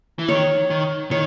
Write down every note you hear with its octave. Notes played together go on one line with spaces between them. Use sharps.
E3
D#3 C#5
D#3
D#3 C#5